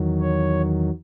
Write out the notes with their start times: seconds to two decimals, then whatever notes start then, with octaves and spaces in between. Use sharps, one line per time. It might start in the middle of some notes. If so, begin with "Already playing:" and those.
Already playing: E2 D#3 F#3
0.21 C#5